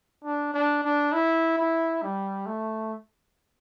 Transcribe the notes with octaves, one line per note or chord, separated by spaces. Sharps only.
D4
D4
D4
E4
E4
G3
A3